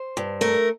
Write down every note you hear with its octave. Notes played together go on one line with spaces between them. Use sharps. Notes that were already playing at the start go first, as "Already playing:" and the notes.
Already playing: C5
G2
A3 A#4